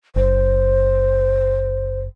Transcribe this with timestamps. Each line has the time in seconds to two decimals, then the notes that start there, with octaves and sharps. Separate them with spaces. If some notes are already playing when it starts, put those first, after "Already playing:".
0.16 F#1 C5